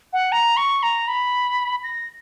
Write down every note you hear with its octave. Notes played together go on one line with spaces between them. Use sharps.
F#5
A#5
C#6
A#5
B5
A#6